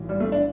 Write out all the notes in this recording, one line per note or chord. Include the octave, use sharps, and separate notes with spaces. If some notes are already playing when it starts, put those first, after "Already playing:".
Already playing: B1 A2 E3
G3
A3
D4